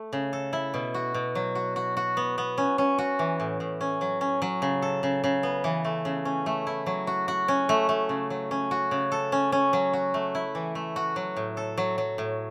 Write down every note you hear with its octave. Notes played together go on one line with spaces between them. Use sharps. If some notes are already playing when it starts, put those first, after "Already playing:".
Already playing: A3
C#3
A4
E4
B2
F#4
B2
F#3
F#4
F#4
F#4
B3
B3
C#4
C#4
F#4
E3
A2
A2
C#4
F#3
C#4
F#3
C#3
A4
C#3
C#3
B3
E3
A3
C#3
C#4
A3
E4
F#3
F#4
F#4
C#4
A3
A3
C#3
F#3
C#4
F#4
C#3
A4
C#4
C#4
F#3
F#4
A3
E4
E3
A3
F#4
F#3
A2
A4
F#3
F#3
A2